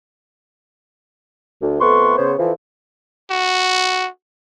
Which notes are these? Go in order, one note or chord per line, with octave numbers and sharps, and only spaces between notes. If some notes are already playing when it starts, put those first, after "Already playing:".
D2
F2 A3 B3 B4 C6 C#6
C#3 B3 C5 C#5
F2 E3 F3
F#4